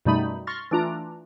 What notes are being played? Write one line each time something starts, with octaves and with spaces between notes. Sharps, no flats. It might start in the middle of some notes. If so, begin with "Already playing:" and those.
F#2 B2 G3 A3 D#4 B5
C6 C#6 F6 A6 A#6
E3 A3 D4 F4 A#5